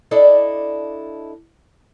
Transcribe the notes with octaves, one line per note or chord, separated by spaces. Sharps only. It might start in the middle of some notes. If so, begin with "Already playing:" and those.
D4 E4 A4 D5 D#5